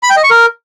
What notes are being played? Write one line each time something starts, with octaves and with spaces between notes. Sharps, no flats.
B5
G5
D#5
C#6
A#4